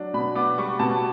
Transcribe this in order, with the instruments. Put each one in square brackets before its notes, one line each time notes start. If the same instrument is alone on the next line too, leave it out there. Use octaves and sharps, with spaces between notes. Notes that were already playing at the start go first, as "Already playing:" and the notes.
Already playing: [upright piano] F#3 D4
B2 B5
B3 D6
G3 C#6
B2 A5